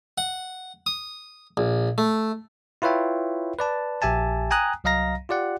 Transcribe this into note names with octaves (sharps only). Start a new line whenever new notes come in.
F#5
D#6
A#1
A3
E4 F4 B4 C#5 E5 G5
B4 D5 A5
A#1 G4 E5 G#5 A5
G5 G#5 A#5 D#6 F#6
C2 F#3 D#5 F5 A#5 A#6
F4 G4 D5 F#5